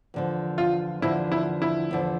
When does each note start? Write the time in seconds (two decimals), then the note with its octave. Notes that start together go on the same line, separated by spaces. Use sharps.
0.14 E2 D3 F3
0.58 F4
1.02 E2 D3 F3 E4
1.32 E4
1.62 E4
1.91 E2 D3 F3